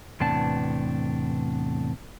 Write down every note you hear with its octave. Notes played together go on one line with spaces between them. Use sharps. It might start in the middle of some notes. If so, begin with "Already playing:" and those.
E2 A2 C3 B3 D4 A5